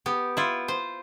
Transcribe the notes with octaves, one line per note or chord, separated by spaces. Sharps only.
B3 G4
E4 F4
C5